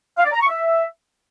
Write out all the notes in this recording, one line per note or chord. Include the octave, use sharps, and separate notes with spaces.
F5
D5
A#5
C#6
E5